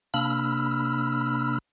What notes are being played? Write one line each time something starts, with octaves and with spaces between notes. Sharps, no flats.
C3 A#3 D4 B5 E6 F6